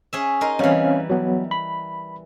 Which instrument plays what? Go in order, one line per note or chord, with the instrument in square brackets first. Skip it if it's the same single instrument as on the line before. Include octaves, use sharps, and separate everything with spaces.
[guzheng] C#4 G#4 E5
D#4 A#4 C6
[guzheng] E3 G3 [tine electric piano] C4 C#4 F5
[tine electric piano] F#3 B3
B5